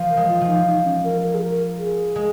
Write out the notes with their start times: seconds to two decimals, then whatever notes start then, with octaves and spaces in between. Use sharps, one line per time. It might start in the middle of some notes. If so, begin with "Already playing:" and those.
Already playing: F3
0.10 A#4
0.17 G#3
0.29 F4
0.41 F3
0.47 D#4
0.66 D#4
0.85 C#4
1.04 A#4
1.22 A#4
1.34 G#4
1.41 A#4
1.78 G#4
2.16 G#3